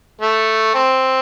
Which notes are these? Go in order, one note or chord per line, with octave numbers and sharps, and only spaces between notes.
A3
C4